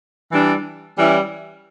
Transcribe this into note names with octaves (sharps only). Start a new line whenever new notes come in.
E3 G3 D4
E3 G3 C#4 E4